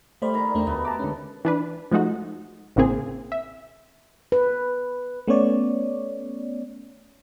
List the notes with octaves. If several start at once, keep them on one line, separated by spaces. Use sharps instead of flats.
G3 A3 C5 D5 B5
D#3 A#5
E2 A3 D4 G4 A#4 C5
D2 B2 A3 B3
B3 A5 A#5 D6
D3 G#3 C#4
E3 D4 B4
F3 G#3 A3 D#4 F#4
A1 A2 C#3 A#3 C4 G#4
E5
B4
A3 B3 C#4 C#5 D5